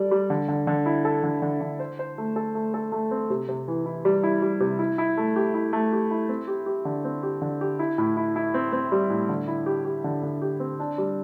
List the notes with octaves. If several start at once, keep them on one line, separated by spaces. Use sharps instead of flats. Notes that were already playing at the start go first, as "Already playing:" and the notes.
Already playing: G3 A4 D5
G3
D3
D3
D3
E4
A4
D3
D3
D3
C5
C5
A3
A4
A3
A4
A3
C4
C3
C3
E3
E4
G3
E4
G3
C3
E4
E4
A3
G4
E4
A3
G4
E4
C4
G4
G4
D3
C4
G4
D3
G4
E4
A2
E4
E4
C4
C4
G3
A2
D3
E4
G4
G4
D3
D3
G4
C4
D4
G3